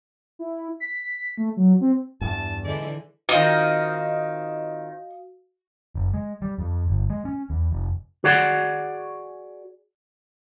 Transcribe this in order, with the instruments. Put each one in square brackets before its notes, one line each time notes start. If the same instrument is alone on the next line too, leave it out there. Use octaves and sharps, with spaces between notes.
[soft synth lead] E4
B6
A3
F#3
C4
[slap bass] E2 G2 [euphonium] E4 [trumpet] A5
[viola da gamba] D3 E3 E4 [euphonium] G#3 [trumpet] D5
[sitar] D#3 C4 F4 [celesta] F#4 F5 [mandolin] D#5
[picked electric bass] F#1
G#3
G3
F2
G1
G#3
C#4
E2
F1
[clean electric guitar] F#4 G#4 D5 F#5